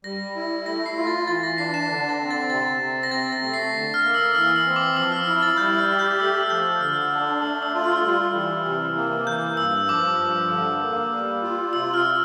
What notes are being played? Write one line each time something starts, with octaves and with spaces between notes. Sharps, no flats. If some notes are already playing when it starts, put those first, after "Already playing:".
G3 A#6
E4
A3 A#6
C7
F4
A6
E3 A6
A#6
D4 C7
C7 E7
D3
A6
C4
A6
C3 A6
C4
A#6
C3 A6
A#6
A3
C7
D3
F6
A#3
E6
E3 F6
E6
C4
D6
F3 E6
F6
E4 F6
A6
G3 G6
F6
G4
G6
A3 E6
F6
F3 G6
D3 F6
D4
A3 E6
E6
F4
F6
G3
E3
C3
A#3
E3 G6
G2 E6
F3 D6
G2
D3
A#3
G3
F4
C3 E6
F6